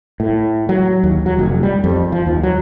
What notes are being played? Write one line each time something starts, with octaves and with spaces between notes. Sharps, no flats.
A2
F#3
D#2
F#3
F1
G3
F2
F3
D#2
F#3